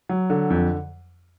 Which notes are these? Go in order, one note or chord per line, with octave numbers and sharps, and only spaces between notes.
F#3
D3
F2